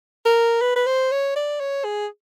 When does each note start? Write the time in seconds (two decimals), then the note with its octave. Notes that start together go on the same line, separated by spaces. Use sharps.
0.25 A#4
0.61 B4
0.76 B4
0.87 C5
1.12 C#5
1.36 D5
1.60 C#5
1.84 G#4